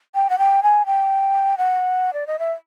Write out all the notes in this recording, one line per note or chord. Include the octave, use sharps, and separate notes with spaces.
G5
F#5
G5
G#5
G5
F#5
D5
D#5
E5